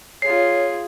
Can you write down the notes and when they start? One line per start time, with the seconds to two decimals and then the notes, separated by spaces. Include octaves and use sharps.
0.22 F4 G#4 C#5 C7